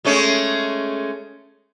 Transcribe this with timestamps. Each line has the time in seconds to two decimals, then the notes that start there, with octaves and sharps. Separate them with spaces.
0.05 G#3 A3 C#4